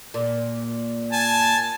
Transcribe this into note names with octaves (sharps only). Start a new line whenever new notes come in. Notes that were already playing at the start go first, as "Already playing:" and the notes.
A#2
G#5 A5